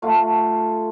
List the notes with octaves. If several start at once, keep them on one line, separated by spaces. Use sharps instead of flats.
A3 F4 F#5